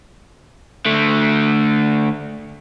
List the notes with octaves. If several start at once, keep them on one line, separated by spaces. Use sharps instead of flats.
D3 A3